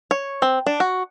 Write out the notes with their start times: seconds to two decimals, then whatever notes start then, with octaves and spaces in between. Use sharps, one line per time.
0.11 C#5
0.42 C4
0.66 D4
0.80 F#4